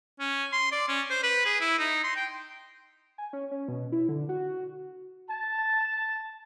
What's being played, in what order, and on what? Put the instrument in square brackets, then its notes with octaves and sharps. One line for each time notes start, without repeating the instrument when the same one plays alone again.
[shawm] C#4
C6
D5
C#4
C5
B4
G#4
E4
D#4
C6
G5
[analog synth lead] G#5
C#4
C#4
B2
E4
D3
F#4
[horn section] A5